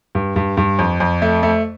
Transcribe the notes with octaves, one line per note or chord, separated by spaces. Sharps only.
G2
G2
G2
F2
F2
A3
A3